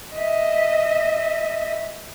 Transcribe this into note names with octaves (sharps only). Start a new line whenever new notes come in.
D#5 E5